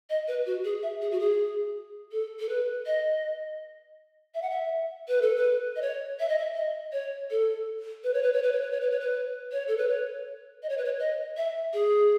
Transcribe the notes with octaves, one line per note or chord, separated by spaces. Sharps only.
D#5
B4
F#4
G#4
E5
G#4
F#4
G#4
A4
A4
B4
D#5
E5
F#5
E5
B4
A4
B4
D#5
C#5
E5
D#5
E5
D#5
C#5
A4
B4
C#5
B4
C#5
B4
C#5
B4
C#5
B4
C#5
B4
C#5
A4
B4
C#5
D#5
C#5
B4
C#5
D#5
E5
G#4